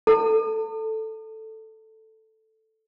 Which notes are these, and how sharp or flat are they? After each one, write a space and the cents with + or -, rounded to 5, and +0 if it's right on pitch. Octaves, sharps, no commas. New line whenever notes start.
A4 +0 A5 +45